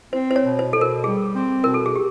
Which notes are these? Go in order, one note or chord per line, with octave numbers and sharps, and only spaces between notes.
C4 C5
C5
C#5
B2
C5
B2 A4
A#4
G3 G#4
C4
B2 A#4
A4
G#4
G4